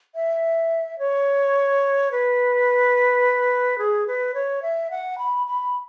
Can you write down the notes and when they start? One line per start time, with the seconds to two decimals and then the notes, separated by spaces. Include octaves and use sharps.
0.15 E5
0.99 C#5
2.12 B4
3.78 G#4
4.07 B4
4.34 C#5
4.62 E5
4.91 F#5
5.18 B5
5.47 B5